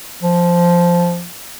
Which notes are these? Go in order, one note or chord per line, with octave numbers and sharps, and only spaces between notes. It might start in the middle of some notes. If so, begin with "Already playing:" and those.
F3